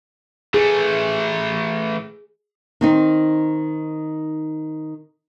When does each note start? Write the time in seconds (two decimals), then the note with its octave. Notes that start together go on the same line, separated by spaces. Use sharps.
0.54 E3 A3 G#4
2.81 D#3 C4 D#4